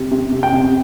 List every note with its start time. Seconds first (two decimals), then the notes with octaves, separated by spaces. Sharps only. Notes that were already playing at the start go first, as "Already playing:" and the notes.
Already playing: C3
0.11 C3
0.32 C3
0.43 G5
0.53 C3